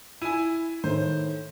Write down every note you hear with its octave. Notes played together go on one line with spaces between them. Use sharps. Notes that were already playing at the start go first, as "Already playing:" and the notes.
E4 G#5 D#7
A2 D#3 C5